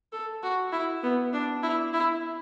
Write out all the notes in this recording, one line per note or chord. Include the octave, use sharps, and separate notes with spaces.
A4
F#4
E4
B3
D4
E4
E4